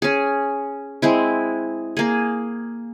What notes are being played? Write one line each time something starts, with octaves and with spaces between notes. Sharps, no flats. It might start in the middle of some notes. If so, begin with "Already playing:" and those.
C#4 G#4
G#3 C4 E4
A#3 G#4